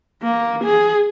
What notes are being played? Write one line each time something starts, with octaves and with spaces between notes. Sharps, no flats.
A#3
G#4